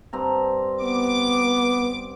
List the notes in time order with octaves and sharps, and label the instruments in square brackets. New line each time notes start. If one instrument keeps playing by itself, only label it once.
[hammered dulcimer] G2 C4 A#5
[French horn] B3 [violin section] D6